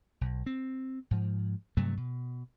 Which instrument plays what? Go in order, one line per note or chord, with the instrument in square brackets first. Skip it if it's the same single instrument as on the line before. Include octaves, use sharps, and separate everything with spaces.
[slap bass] B1
C4
G#2 F3
G2 C3 F#3 A3
B2